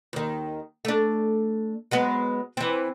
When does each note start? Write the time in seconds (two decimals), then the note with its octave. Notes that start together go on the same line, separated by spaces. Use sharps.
0.13 D#2 D#3
0.85 A3 D4
1.91 F#3 G#3 B3
2.57 E3 C4